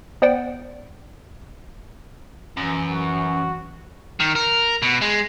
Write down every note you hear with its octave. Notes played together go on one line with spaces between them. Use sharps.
B3 C5 D5 F#5 G5
F#2 E3
F#4
D#3
A#4
B2
G#3